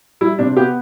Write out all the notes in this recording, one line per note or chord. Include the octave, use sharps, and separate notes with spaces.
G3 E4
C3 D4
B3 G4